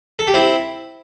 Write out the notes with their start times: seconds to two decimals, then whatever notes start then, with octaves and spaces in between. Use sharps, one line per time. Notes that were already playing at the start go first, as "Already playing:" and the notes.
0.19 A4
0.27 G4
0.34 C4 E4